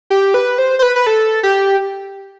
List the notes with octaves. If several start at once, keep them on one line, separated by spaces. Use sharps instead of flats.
G4
B4
C5
C5
B4
B4
A4
G4